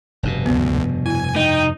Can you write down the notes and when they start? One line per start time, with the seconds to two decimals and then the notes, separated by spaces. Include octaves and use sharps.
0.23 F1 G2 B2
0.46 D2 B3
1.06 E4 G#5
1.36 D#4 G5